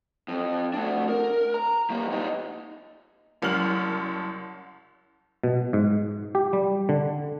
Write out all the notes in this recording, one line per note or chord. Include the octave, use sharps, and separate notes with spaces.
F2
A3 D4
A#4
A#5
G3 A#3
A#2 D#4
F#1 C2 F#2 F6 F#7
B2
G#2
G4
G3
D3